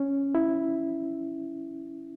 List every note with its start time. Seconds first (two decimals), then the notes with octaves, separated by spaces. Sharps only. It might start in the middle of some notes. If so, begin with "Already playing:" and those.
Already playing: C#4
0.35 E4